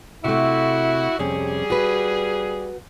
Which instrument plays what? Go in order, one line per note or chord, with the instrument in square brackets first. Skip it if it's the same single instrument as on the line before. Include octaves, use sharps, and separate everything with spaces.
[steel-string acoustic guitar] C3 A3 [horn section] E4 F#4
[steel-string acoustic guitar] F2 C3 C#4 [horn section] G3 G#4
[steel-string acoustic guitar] F#4 B4